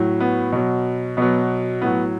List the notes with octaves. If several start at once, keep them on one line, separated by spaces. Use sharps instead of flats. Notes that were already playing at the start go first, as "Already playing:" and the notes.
Already playing: A2 F#3
B3
B2 F#3
B2 F#3 B3
A2 F#3 B3